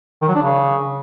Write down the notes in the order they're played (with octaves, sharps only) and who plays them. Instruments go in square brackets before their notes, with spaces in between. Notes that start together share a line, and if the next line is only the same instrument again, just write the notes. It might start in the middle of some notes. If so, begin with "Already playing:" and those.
[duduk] D#3
F#3
D4
C#3